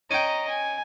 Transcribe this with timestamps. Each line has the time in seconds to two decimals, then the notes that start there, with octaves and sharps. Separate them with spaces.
0.11 C#4 D#5 G5 A#5
0.48 G#5